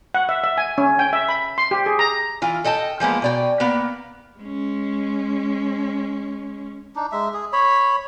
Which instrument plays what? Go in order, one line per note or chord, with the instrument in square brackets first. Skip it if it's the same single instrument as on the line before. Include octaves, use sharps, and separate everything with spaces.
[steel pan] F#5
E5
E5
G#5
C#4
G5
E5
B5
C6
G4
G#4
A#5
[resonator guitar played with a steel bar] E3 F4
A4 D#5 G5 A5
F3 G#3 A#3 B3
B2 D5 G5
A#3 B3
[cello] G#3 C#4
[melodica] D4 D#4
G#3 E5
G#4
C#5 B5